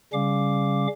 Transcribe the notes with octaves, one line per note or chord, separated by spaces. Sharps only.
C#3 G3 C#4 F5 D6